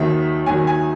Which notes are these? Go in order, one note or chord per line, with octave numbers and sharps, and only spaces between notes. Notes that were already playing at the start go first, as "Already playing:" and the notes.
Already playing: D#2 D#3 F#3 E5
D#2 D#3 F#3 G#5
G#5